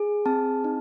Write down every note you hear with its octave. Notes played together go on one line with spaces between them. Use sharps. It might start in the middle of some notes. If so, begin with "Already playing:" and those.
Already playing: G#4
C4 A5
D#4